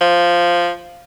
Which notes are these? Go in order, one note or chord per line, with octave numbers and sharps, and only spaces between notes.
F3